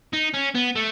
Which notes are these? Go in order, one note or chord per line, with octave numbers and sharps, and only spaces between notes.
D#4
C#4
B3
A3